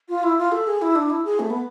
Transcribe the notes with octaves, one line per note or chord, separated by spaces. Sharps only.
F4
E4
F4
A4
G#4
E4
D4
E4
G#4
A3
B3